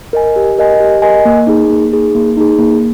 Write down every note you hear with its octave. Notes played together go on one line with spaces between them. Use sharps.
A#4 D#5 G#5
G4
A#4 D#5 G#5
G4
A#4 D#5 G#5
A#3
D#4 G#4
A#3
D#4 G#4
A#3
D#4 G#4
A#3